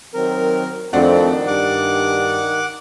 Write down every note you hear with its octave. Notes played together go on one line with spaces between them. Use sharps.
D#3 F#3 C4 A#4
F2 D#3 A3 C4 D4 F#4
G2 F#5 D6